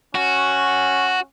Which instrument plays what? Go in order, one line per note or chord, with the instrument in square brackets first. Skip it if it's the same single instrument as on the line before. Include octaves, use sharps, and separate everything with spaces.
[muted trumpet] C#4 [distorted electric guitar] F#4